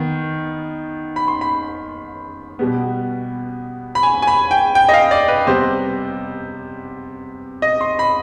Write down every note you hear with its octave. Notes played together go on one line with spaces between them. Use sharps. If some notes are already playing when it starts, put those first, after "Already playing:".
Already playing: D#3 B3
B5
C6
B5
B2 G3 B3
B5
G#5
G#5
B5
G5
G5
D#5
F5
D5
B4
C3 G3 B3 C5
D#5
C6
B5